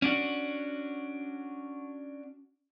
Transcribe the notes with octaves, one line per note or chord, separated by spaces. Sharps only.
C#4 D4 F#4